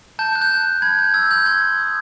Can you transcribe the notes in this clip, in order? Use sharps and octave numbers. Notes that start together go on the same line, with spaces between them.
A5 G6
F#6
G6
A5
F#6
B5 G#6
G6
E6 G#6
B5 G6
C6 G#6
G6
D#6